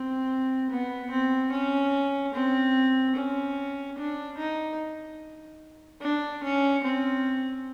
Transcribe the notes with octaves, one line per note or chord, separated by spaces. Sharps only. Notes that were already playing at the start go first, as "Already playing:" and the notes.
Already playing: C4
B3
C4
C#4
C4
C#4
D4
D#4
D4
C#4
C4